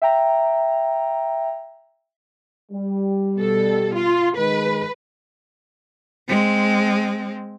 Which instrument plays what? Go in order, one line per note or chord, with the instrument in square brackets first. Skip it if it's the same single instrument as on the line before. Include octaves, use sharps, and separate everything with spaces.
[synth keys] E5 G5 A#5
[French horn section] G3
[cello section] B2 A4
F4
[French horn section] D#3 G#3 [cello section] B4
[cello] G#3 C4